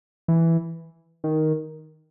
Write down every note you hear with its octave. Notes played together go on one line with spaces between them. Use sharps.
E3
D#3